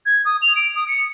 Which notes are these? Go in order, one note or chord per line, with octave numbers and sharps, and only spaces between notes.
G#6
D#6
F7
D7
D#6
C#7